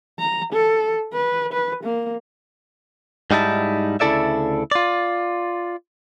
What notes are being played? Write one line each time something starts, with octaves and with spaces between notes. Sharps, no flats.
A#5
A4
B4
B4
A#3
G#2 G3 D#4 E4 A5
D2 C#3 E4 A4 D5 E5
F4 D5